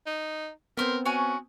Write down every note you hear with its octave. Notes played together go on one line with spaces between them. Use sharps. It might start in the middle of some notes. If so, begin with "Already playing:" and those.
D#4
B3 C4 A#4 B4 C6 G6
C#4 F#4 G#5